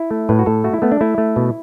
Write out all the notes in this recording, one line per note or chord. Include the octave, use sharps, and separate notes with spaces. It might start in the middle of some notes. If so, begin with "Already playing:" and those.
Already playing: E4
A3
A2 B4
F#4
A2 A4
A3 F#4
E4
A3 B3
D4
A3 E4
A3
B2